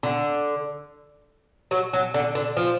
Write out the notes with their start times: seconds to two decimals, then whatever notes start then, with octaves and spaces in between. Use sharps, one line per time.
0.03 D3
1.71 F#3
1.93 F#3
2.14 D3
2.35 D3
2.57 F3